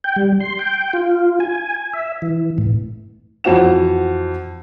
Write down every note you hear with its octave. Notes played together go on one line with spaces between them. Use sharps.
G5
G3
C6
G5
F4
G#5
E5
E3
A2
F2 E3 F#4 C5 F#5 E7